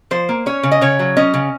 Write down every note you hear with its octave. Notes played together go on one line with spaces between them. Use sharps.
F3 C5
A#3
C#4 C#5
C#3
D#5
C#3 C#5
F#3
C#4 D#5
C#3